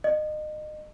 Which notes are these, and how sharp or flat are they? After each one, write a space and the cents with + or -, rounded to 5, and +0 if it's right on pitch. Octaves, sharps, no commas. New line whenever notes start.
D#5 -30